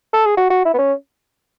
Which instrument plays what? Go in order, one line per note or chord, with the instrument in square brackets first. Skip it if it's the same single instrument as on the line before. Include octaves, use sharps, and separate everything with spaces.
[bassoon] A4
G#4
F#4
F#4
E4
B3
C#4